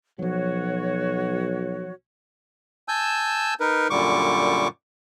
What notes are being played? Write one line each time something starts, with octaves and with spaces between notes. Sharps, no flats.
B1 F3 F#3 F#4 C#5
G#5 A5 E6 G6
D#4 A#4 B4
F#2 A#2 D3 G3 C#6 D6